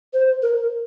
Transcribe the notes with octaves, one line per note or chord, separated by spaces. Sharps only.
C5
A#4